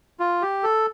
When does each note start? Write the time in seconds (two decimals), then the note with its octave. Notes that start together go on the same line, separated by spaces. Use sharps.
0.20 F4
0.42 G4
0.63 A4